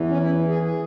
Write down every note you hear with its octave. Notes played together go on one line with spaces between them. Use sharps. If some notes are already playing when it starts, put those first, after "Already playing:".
Already playing: E2 E3
C#4
E4
G#4
G#4